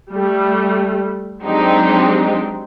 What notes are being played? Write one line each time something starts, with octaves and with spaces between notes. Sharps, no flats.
G3 A3
F#3 G#3 C4 D4 D#4 G4